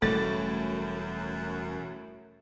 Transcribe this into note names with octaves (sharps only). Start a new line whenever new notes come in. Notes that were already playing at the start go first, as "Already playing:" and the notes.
E1 F#2 A2 G3 A3 A4 A6